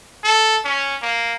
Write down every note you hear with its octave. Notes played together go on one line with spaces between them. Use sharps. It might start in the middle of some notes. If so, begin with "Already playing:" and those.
A4
C#4
A#3